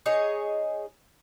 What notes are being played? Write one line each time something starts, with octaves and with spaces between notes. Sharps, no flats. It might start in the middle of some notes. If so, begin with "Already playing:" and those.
D#4 G#4 C#5